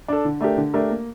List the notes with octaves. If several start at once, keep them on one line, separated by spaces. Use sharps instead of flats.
D4 A4
D3
A3 D4 G4 A#4
D3
A3 D4 G4 A#4
A#3